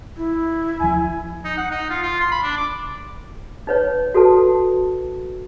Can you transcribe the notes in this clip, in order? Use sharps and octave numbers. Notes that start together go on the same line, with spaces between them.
E4
D2 F3 G#5
D#4
F#5
D#4
F4
F4
C6
B5
D4
D6
D#4 B4 C#5
F#4 A4 B4 A5